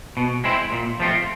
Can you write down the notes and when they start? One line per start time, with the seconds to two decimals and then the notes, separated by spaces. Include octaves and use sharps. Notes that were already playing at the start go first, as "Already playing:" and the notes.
0.17 B2
0.44 G#3 C4 E4
0.72 A#2
1.00 F3 A3 C4 F4